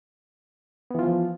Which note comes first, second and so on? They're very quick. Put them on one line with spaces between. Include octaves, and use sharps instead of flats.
B3 E3 F4 F3